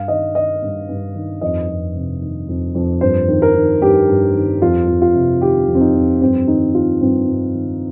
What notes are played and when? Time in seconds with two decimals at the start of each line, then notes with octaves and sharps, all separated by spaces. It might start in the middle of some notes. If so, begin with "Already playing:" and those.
Already playing: G2 F5
0.08 D#3 D#5
0.35 D#3 D#5
0.62 G2
0.89 G2
1.15 D#3
1.41 F2 D#5
1.69 F2
1.94 C3
2.22 D#3
2.48 F2
2.75 F2
3.01 G2 C5
3.28 D#3
3.42 A#4
3.55 D#3
3.81 G2 G4
4.08 G2
4.35 D#3
4.61 F2 F4
4.88 F2
5.01 F4
5.14 C3
5.41 D#3 G4
5.68 F2
5.75 C4
5.81 D#4
5.94 F2
6.21 G2 C4
6.47 D#3 D#4
6.74 D#3 F4
7.01 G2 C4
7.28 G2
7.54 D#3